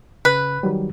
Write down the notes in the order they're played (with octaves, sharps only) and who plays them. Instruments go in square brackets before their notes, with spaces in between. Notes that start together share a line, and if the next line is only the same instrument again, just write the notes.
[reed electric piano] C#3 F#6 [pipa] B4
[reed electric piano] D#3 F#3 G3